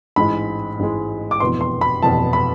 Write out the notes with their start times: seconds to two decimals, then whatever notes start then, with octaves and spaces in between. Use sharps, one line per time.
0.16 A1 G#2 G#3 B5
0.79 A1 G#2 G#3
1.31 D6
1.40 F1 E2 B2 B3 C6
1.61 C6
1.81 B5
2.02 F1 E2 B2 B3 A5
2.33 B5